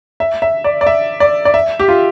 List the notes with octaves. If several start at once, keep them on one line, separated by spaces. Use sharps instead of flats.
E5
E5
D5
D5
E5
D5
D5
E5
G4
F4